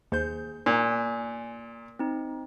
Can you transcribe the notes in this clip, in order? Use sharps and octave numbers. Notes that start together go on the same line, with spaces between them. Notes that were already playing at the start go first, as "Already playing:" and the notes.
D#2 G#4 C5 G6
A#2 G#5
C4 D#4